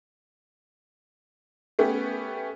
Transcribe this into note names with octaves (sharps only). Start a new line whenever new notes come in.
A3 B3 C#4 G4